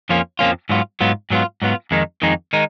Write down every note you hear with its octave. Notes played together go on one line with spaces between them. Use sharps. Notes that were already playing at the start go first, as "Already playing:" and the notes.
F2 F3 A#3 C#4 F4
F2 F3 A#3 C#4 F4
G#2 F#3 B3 F4
G#2 F#3 B3 F4
G#2 F#3 B3 F4
G#2 F#3 B3 F4
F2 D#3 G#3 D#4
F2 D#3 G#3 D#4
D#3 G#3 D#4